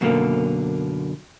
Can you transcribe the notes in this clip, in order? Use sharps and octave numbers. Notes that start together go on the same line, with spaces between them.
F#2 B2 D3 A#3